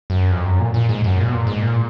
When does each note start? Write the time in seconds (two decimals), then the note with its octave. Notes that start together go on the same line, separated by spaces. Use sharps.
0.10 F#2
0.31 F2
0.45 F#2
0.60 A#2
0.74 A#2
0.89 G#2
1.04 F#2
1.19 A#2
1.28 B2
1.33 A#2
1.47 G#2
1.62 A#2